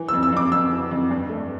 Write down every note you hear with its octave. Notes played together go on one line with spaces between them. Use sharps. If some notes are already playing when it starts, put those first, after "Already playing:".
Already playing: E3
E6
F2
E6
F2 D6
F2 E6
E3
F2
G2
A3